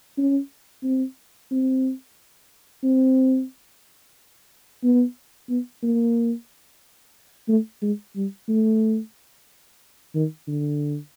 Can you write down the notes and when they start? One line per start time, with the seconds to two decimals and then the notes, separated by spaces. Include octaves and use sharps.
0.18 C#4
0.83 C4
1.51 C4
2.83 C4
4.83 B3
5.49 B3
5.83 A#3
7.48 A3
7.82 G#3
8.16 G3
8.48 A3
10.15 D#3
10.47 D3